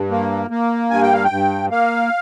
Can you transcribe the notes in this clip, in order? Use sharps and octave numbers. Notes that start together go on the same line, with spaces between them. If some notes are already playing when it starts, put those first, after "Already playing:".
Already playing: G2
A#3
A#3
G2 G#5
G5
F5
G5
G2
A#3 F5